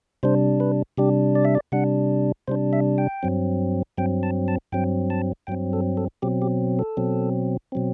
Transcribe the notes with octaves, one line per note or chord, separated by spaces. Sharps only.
C3 G3 D4 C5
B4
C3 G3 D4 G4
D5
E5
D5
C3 G3 D4 F#5
C3 G3 D4 C5
E5
G5
G2 F#3 C4
G2 F#3 C4 G5
A5
A5
G2 F#3 C4 G5
A5
G2 F#3 C4 G5
A4
A4
B2 F#3 C4 G4
G4
A4
B2 F#3 C4
B2 F#3 C4